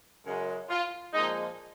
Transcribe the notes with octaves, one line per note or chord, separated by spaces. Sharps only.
F#2 C#3 G#3
F4
A#2 F3 G#3 D#4